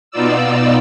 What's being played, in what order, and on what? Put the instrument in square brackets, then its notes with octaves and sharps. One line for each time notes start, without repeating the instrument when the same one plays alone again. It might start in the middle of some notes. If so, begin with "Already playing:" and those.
[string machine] B2 B3 D#4 F4 D5 E6